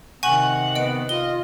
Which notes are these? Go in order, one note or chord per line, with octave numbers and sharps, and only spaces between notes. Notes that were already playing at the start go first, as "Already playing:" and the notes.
C3 D#3 F#5 G#5 C#6
B3 D#5 D7
F4 D#5 G7